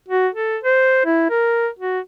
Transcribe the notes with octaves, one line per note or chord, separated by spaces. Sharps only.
F#4
A4
C5
E4
A#4
F#4